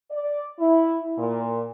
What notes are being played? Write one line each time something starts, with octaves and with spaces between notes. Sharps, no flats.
D5
E4
A#2